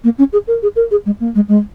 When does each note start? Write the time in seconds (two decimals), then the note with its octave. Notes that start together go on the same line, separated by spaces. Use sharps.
0.04 A#3
0.18 C#4
0.33 G#4
0.47 A#4
0.62 G#4
0.76 A#4
0.91 G#4
1.06 G#3
1.20 A#3
1.35 G#3
1.48 G#3